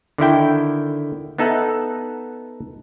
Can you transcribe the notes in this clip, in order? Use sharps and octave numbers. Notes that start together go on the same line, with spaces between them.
D3 D#3 E4 G5
B3 D#4 A4 E5 F#5